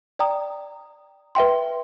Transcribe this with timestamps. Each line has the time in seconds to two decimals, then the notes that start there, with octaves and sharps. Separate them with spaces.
0.19 D5 G5 A#5 D#6
1.35 B4 E5 G5 C6